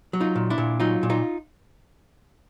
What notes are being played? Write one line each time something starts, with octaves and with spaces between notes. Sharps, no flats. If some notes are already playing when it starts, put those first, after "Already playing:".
F#3
D#4 F4
A#2
D4 E4
A#2
F#3 D#4 F4
A#2
D#4 F4